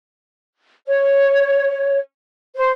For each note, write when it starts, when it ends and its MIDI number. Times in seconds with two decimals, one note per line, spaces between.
0.87 1.99 73
2.56 2.71 72